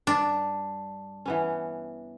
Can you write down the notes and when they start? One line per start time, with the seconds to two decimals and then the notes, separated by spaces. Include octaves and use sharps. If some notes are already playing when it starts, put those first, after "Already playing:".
0.07 G2 D4
1.26 E3 B3 C#4